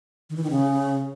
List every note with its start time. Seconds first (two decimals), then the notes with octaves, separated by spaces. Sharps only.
0.30 D#3
0.36 E3
0.43 D#3
0.50 C#3